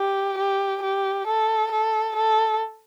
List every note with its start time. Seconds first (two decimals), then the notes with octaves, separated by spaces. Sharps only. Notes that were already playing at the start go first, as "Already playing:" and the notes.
Already playing: G4
0.38 G4
0.83 G4
1.27 A4
1.72 A4
2.16 A4